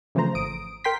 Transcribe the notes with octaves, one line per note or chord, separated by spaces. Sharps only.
C#3 E3 F3 A3 C5 A#5
G#1 D#6 D7
A#4 G5 C6 B6